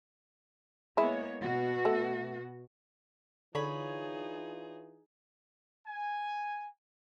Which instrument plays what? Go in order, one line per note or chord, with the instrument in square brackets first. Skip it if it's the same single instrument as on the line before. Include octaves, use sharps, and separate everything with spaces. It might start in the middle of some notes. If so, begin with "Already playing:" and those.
[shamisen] G#3 E4 [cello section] A#3 B3 C#5
[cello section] B2 F#4
[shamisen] A3
[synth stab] D3 [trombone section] E3 D4 F4 [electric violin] D#4 G#4 [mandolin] C#5 B5
[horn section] G#5